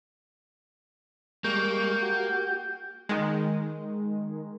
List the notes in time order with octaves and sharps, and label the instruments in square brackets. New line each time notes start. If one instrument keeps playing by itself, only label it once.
[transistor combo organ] G3 G#3 C#6 [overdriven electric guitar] A#3 [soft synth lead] G6
[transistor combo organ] F#4 G4
[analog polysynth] D#3 G#3